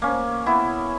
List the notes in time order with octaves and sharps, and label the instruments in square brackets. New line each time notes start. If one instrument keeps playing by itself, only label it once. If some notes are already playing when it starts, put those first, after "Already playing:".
[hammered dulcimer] A#3 C#4
B3 E4